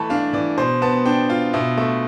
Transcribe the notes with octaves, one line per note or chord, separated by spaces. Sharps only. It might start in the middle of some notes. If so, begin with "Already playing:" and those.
Already playing: E3 A3 A5 B5
D4 F5
E3 D5
B2 C5
B3 A5
D4 G5
F4
B2 E5
A3 E5